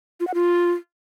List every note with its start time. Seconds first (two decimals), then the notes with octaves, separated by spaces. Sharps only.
0.20 F4
0.27 F#5
0.34 F4